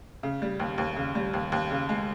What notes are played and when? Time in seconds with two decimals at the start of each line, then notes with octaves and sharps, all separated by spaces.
0.23 C#3
0.42 G3
0.60 D#2
0.78 D#2
0.96 C#3
1.15 G3
1.34 D#2
1.52 D#2
1.71 C#3
1.89 G#3